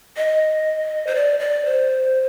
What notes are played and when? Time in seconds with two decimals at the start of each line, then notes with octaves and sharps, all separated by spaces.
0.17 D#5
1.07 C5
1.15 D5
1.40 D5
1.65 C5